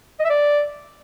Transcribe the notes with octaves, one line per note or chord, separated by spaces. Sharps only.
D#5
E5
D5